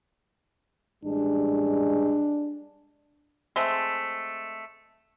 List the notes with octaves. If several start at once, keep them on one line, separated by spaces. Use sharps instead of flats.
A1 G3 G#3 D4
G#3 A3 C4